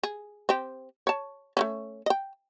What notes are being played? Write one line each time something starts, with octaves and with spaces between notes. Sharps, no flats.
G#4
C4 G4
C#5 A5
A3 A#3 C#4
D#5 G5